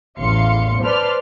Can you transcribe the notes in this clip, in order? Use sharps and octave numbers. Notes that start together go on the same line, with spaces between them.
A1 E2 F5 C6 C#7
B4 C5 D5 A5 C6 F6